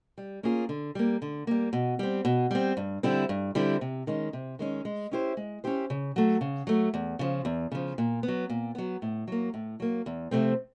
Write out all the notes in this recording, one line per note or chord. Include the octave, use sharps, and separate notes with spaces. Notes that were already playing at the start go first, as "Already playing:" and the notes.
G3
A#3 C#4 F4 G#4
D3
G3 A#3
D3
G3 A#3
B2
G3 C4
B2
G3 C4
G2
D3 G3 C4 E4
G2
D3 G3 C4 E4
C3
D#3 G#3 C#4
C3
D#3 G#3 C#4
G#3
C#4 E4 G4 C5
G#3
C#4 E4 G4 C5
C#3
F#3 A3
C#3
F#3 A3
E2
C#3 F3
E2
C#3 F3
A#2
B3
F#3
A#2
F#3 B3
A2
F#3 A#3
A2
F#3 A#3
E2
C3 F3 A3 C4